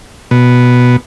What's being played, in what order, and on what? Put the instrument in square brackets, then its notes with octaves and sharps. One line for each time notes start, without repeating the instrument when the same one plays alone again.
[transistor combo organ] B2